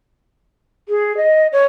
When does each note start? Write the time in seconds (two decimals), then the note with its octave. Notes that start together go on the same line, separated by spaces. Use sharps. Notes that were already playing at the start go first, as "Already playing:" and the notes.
0.89 G#4
1.17 D#5
1.52 C#5